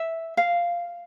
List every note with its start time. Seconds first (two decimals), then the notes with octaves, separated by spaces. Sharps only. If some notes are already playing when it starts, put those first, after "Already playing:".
Already playing: E5
0.37 F5